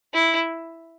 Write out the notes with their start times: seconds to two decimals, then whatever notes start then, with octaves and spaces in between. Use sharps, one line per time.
0.14 E4